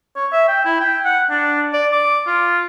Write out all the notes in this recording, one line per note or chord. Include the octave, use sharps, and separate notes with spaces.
C#5
E5
G5
E4
G5
F#5
D4
D5
D6
F4